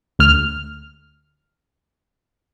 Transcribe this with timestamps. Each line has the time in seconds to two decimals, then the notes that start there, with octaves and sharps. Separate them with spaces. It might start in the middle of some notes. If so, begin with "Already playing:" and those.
0.19 D2 F6